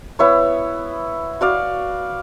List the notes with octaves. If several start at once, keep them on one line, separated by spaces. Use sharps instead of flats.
B3 E4 C#5
F#4 D5 F5